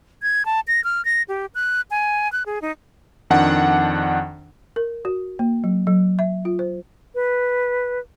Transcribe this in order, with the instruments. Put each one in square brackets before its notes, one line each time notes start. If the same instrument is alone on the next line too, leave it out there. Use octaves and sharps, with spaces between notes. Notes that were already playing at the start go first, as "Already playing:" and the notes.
[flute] G#6
A5
A#6
F6
A#6
G4
F#6
G#5
F#6
G#4
D#4
[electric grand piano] F2 D#3 D4 F#5
[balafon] A#4
F#4
A#3
F#3
F#3
E5
F4
C5
[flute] B4